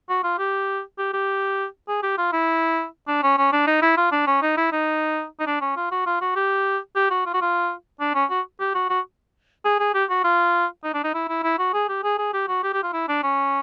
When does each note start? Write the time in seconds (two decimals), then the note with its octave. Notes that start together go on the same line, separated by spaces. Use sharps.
0.09 F#4
0.24 F4
0.39 G4
0.98 G4
1.13 G4
1.88 G#4
2.03 G4
2.18 F4
2.33 E4
3.08 D4
3.23 C#4
3.38 C#4
3.52 D4
3.67 D#4
3.82 E4
3.97 F4
4.12 D4
4.27 C#4
4.42 D#4
4.57 E4
4.72 D#4
5.40 D#4
5.47 D4
5.61 C#4
5.76 F4
5.92 F#4
6.06 F4
6.21 F#4
6.36 G4
6.96 G4
7.11 F#4
7.26 F4
7.34 F#4
7.42 F4
8.00 D4
8.15 C#4
8.30 F#4
8.60 G4
8.75 F#4
8.90 F#4
9.65 G#4
9.79 G#4
9.94 G4
10.10 F#4
10.24 F4
10.84 D#4
10.94 D4
11.04 D#4
11.14 E4
11.29 E4
11.44 E4
11.59 F#4
11.73 G#4
11.89 G4
12.04 G#4
12.18 G#4
12.34 G4
12.48 F#4
12.63 G4
12.73 G4
12.83 F4
12.93 E4
13.08 D4
13.23 C#4